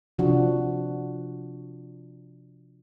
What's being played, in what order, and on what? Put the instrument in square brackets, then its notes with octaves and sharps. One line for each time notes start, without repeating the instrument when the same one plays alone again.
[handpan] C3 F3 D4 F#4